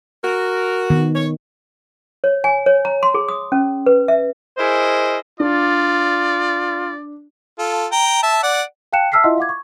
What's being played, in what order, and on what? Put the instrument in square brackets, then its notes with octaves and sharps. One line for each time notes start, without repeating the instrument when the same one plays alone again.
[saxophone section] F#4 A#4
[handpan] D#3 B3
[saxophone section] C#5
[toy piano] C#5
G#5
C#5
A#5
C6
G#4
D#6
C#4
B4
E5
[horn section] E4 G#4 A#4 C5 D#5
[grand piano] D4 [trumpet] F4 [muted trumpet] D5
[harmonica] F4 A4
G5 A#5
E5 A5
D5 F#5
[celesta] F5 G5 A5 F#6 C#7 E7
E5 A5 E6 F6 B6 C7
E4 F4 D#5 E5 F#5 C6
F5 F#5 D6 G#6
C#6